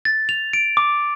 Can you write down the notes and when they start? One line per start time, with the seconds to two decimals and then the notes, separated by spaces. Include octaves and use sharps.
0.05 A6
0.29 F7
0.53 D7
0.77 D6